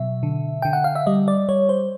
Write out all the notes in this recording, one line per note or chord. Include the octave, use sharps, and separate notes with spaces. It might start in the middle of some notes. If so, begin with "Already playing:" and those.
Already playing: B2 F#3 E5
D3
D3 G5
F#5
F5
E5
G3 D#5
D5
G3 C#5
C5